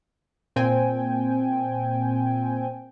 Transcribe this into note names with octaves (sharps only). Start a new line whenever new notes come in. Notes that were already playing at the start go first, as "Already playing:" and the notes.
A#2 C4 G5 G#5